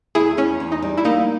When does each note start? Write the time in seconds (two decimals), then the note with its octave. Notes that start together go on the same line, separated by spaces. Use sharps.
0.15 E2 E4 G#4
0.37 E2 C#4
0.60 E2
0.72 D#4
0.82 G3
0.97 E4
1.04 A#3 D#4